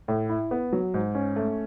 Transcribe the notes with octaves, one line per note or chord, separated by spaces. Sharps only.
A2
E4
B3
F#3
G#2
C#4
A3